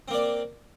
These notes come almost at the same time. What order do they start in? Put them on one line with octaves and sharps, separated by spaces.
C4 A#3 D5